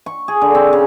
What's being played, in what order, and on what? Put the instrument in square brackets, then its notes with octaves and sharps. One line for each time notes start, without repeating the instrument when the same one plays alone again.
[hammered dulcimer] C#6
G#4
D3
C4
C#3